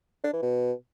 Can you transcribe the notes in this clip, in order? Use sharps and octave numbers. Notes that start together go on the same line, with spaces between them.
D4
E3
B2